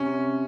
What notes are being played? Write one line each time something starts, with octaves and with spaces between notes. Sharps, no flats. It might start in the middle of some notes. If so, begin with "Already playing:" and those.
Already playing: C3 C#4